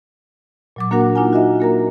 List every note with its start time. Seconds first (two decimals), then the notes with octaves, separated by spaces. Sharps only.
0.76 A#2 F#3 D6
0.91 A#3 D4 F#4 A#4 F#5
1.15 D4 D#4 F4 F#5 G#5 A#5
1.33 F#4 D#5 E5 F#5
1.60 A#3 A#4 A#5